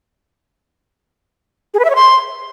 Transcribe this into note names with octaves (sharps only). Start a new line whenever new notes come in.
G#4
B4
E5
C#5
C6